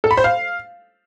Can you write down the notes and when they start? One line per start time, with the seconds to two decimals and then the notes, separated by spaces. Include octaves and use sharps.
0.04 A4
0.11 B5
0.17 C5
0.24 F5